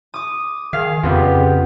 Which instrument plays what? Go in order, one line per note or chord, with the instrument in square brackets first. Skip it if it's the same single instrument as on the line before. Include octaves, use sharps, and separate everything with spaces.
[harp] D6 D#6
[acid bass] D#3 [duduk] G#4 [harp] F5
[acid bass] F2 [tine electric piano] C#3 B3 F4 [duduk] G4